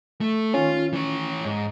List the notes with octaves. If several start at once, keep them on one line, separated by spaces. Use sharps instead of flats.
A3
D#3 C#4 F4
E3 C#5
G#2